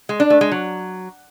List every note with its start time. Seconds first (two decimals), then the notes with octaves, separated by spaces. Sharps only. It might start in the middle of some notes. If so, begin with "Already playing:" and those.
0.09 G#3
0.20 D4
0.30 A3
0.41 G#3
0.52 F#3